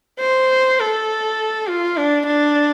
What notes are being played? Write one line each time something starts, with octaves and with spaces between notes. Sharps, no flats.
C5
A4
F4
D4
D4